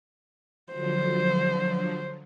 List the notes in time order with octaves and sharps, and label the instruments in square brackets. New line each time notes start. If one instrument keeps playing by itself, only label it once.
[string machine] D3 F3 F#3 [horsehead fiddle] C5